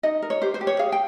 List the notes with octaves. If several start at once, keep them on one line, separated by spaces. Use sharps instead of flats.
D#4 D#5
A#4
C#5
G4 C5
C5
G4
C#5
G#4 F5
G5